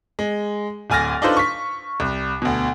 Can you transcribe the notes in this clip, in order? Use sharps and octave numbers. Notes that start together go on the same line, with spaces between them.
G#3
D1 D2 G#5 F6 A6 A#6
D4 D#4 F4 A4 B4 C5
C#6 B6
C2
D2 B2